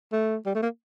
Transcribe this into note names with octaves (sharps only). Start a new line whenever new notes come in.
A3
G3
A3
A#3